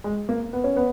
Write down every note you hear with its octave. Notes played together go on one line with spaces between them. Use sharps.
G#3
A#3
B3
C#4
B3